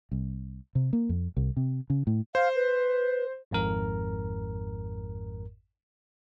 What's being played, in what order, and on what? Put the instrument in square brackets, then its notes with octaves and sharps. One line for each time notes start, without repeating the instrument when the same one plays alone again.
[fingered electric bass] C2
C3
A#3
F2
C2
C3
C#3
A2
[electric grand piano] C5 [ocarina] F5
[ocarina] B4
[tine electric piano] G#1 F2 G#2 A#4